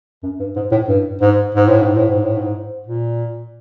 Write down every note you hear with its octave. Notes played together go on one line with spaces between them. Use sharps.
F#2
G2
G#2
A2
G2
G#2
G#2
A2
G#2
A2
G#2
A2
G#2
A#2